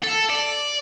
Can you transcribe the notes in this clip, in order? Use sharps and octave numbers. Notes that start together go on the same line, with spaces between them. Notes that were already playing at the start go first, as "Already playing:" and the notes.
A4
D5